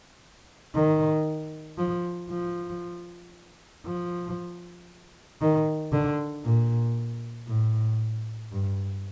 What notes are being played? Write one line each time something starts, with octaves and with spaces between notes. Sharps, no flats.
D#3
F3
F3
F3
D#3
D3
A#2
A2
G2